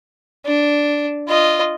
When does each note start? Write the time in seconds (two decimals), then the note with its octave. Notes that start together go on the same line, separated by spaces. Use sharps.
0.45 D4
1.27 F4 D#5